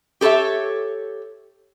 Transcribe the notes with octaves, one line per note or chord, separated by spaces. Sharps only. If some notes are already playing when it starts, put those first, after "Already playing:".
G4 A4 B4 C#5 E5